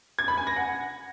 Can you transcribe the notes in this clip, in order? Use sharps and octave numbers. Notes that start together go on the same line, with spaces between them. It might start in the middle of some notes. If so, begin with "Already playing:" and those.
G#6
B5
G#5
A#6
F#5